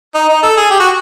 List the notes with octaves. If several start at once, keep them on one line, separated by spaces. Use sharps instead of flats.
D#4
D#4
A4
G#4
G4
F#4